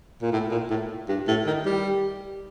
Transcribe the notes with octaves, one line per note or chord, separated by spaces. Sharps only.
A#2
A2
A#2
A2
G2
A2
D#3
G3